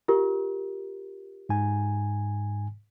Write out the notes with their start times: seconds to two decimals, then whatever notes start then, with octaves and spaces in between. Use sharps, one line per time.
0.08 F4 G4 A#4
1.49 G#2 G#5